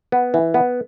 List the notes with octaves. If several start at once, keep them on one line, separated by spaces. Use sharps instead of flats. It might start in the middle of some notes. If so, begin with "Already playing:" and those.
B3
E3
B3